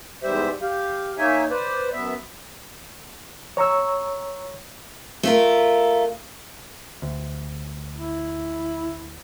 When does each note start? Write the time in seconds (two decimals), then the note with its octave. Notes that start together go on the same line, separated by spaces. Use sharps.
0.23 E2 G#2 G3 G4 C5 E5
0.61 G4 F5
1.18 A#3 D#4 C#5 E5 G#5
1.50 B4 C5 D5
1.92 F#2 B3 E5
3.57 C#5 A#5 C#6 E6
5.23 A3 F4 A#4
7.02 D2
7.97 E4